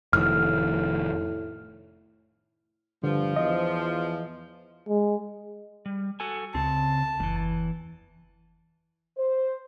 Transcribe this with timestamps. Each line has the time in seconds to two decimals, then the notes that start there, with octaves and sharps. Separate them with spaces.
0.13 F1 A2 D#3 F6
3.04 G2 D3 F3
3.36 E2 D#5
4.89 G#3
5.86 G3
6.20 F#4 A4 G#5
6.55 C#2 C#3 C4 A5
7.20 F#1 E2 E3
9.17 C5